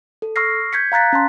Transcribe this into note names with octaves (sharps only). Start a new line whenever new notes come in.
A4
C#6 E6 F6 A#6 C7
G6 G#6 B6 C#7
F5 A#5 F#6 A6 B6
C#4 A5 C6